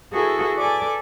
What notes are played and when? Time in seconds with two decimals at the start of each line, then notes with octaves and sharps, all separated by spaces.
0.12 E4 F#4 G#4 A4 B4
0.58 A4 B4 D5 G#5 D6